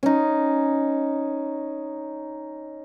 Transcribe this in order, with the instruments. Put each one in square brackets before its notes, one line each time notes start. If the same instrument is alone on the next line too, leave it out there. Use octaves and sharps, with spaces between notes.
[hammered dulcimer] C#4 D#4